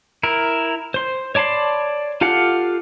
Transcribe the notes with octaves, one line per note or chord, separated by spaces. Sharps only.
E4 A#4
C5 C6
C#5 D5 A5 B5 C6
F4 G4 A4 F5 F#5